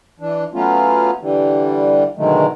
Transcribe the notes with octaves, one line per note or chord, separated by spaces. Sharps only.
E3 D4
F#3 A3 B3 C#4 F4
D3 E3 G3
B2 D3 D#3 F#3 G#3 A3